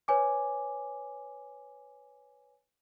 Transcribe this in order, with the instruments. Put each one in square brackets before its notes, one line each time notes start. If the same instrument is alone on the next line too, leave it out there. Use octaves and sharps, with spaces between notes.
[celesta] B4 C#5 G#5 D6